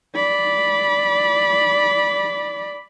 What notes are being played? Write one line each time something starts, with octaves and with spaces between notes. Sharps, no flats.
D5 B5